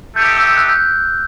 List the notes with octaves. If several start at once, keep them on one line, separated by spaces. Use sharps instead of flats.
A3 D#4 G4 G6
E6
F#6
G6